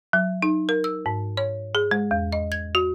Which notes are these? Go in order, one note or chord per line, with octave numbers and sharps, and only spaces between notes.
F#3
D#4
A#4
E6
G#2
C#5
G#4
G#3
E2
D#5
G#6
F#4